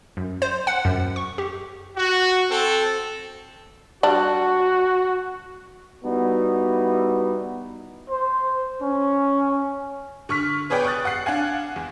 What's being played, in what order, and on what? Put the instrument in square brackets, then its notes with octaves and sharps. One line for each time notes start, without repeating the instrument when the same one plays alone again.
[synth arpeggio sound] F#2
C5
F#5
F#2
C#6
G4
[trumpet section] F#4
C4 A4
[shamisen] G3 D4 [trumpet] F#4
[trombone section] G3 B3 D#4 E4 F#4
[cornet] C5
C#4
[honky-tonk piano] D3 C#6 F6 B6
B3 G#4 B4 C#5 D5 G5
C#6 D#6 F#6 A6
F#5 F#6 C7
D4 F5 F#5 G#5
E2